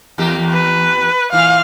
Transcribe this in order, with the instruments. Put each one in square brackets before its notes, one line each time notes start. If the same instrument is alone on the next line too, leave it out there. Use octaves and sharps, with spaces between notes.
[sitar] E2 A#3 G4
[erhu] B4
[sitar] A#2 E3 [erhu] F5